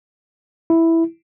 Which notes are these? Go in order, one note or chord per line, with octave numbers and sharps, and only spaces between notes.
E4